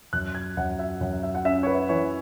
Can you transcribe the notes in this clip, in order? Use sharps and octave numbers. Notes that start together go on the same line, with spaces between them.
F#2 F#6
G#6
F#2 F#5
E5
F#2 F#5
E5
F#5
C#4 E5
C#5
B4
E3 C#5